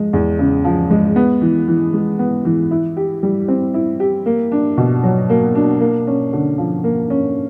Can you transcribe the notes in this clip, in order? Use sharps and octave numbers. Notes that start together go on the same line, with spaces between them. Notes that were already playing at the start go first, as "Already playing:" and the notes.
Already playing: F3 G#3
E2
C#3
F3
G#3
B3
E3
E3
G#3
B3
E3
E4
G4
G3
C4
E4
G4
A#3
D4
B2
F#3
A#3
D4
A#3
C#4
D3
F3
A#3
C#4